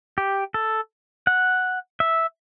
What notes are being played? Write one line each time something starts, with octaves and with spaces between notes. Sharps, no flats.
G4
A4
F#5
E5